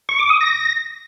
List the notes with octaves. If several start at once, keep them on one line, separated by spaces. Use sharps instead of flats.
C#6
D6
D#6
A#6